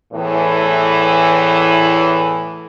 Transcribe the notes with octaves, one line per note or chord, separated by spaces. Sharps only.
E2 A2 E3